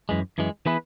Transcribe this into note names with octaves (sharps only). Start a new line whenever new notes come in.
F#2 E3 G#3
F#2 E3 G#3
E3 B3 E4 G#4 B4